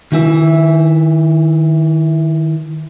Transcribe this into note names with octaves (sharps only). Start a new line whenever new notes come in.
D#3 E4 E5